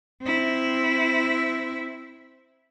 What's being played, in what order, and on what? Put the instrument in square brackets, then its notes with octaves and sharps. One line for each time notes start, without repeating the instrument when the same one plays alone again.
[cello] C4 E4